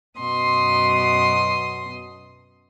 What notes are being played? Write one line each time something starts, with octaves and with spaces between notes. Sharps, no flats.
F#2 B2 C6 D#6